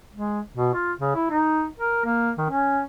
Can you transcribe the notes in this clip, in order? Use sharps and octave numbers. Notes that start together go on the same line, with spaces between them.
G#3
B2
F4
C#3
E4
D#4
A#4
A#3
D#3
C#4